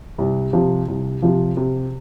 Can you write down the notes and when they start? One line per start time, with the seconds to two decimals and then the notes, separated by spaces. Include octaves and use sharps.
0.18 C2
0.53 C3 F3
0.88 C2
1.22 C3 F3
1.57 C3